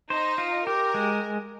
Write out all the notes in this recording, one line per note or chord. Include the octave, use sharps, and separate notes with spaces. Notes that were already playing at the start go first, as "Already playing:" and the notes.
D#4 C5
F4
G4 A#4
G#3